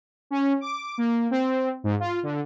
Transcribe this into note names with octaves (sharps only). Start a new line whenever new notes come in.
C#4
D6
A#3
C4
G#2
F4
D3